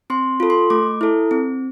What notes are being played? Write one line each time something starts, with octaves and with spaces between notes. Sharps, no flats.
C4 C6
F4 A4
C6
A3 D6
E4 A4
C4